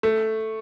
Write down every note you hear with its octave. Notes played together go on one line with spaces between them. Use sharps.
A3